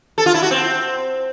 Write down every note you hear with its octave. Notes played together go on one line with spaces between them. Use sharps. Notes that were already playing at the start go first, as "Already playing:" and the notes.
A4
F4
E4
F#4
C4